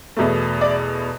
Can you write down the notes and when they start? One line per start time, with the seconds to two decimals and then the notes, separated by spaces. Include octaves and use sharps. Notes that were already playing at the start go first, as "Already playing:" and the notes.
0.17 E2 B2 A3
0.61 D5